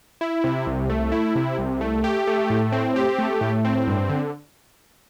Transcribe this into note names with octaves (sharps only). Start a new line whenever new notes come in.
E4
C3
C2
A3
E4
C3
C2
A3
G4
A3
A2
C4
G4
A3
A2
C4
G2
D3